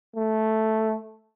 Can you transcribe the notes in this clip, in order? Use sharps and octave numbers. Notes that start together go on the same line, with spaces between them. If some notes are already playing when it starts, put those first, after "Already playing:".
A3